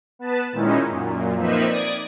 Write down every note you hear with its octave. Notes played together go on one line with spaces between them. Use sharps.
B3 B4 A5
A#2 D#3 G#3 C#4 D#4 E4
F#2 A#2
F3 A#3 C4 D#4 B4 E5
D5 D#6 G#6